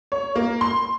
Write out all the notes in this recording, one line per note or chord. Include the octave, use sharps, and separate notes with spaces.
C#5
A#3
C6